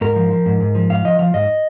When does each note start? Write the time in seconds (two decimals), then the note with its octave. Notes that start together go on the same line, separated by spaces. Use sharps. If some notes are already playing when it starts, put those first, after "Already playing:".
0.01 G#2 A#4
0.16 F3
0.30 F3
0.46 G#2
0.60 G#2
0.75 F3
0.90 G#2 F5
1.05 F3 D#5
1.19 F3 F5
1.34 G#2 D#5